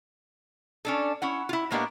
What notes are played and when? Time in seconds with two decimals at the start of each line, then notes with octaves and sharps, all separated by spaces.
0.85 C#4 D4 A4
1.22 C#4 E4 F#5
1.49 E4 F4
1.71 A2 G#3 A#3 B3 D4 G4